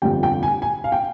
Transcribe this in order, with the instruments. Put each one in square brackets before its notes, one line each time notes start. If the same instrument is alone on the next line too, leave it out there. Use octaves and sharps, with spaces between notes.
[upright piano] G1 F2 C3 G3 G5
G5
G#5
G#5
F5
G5